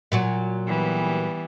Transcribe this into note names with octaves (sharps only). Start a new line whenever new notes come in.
A#2 F#3 F#4
E3 G3 B3